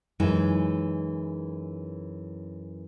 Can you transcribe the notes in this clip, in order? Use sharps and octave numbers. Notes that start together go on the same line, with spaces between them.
F#2 E3 G#3 D#4 E4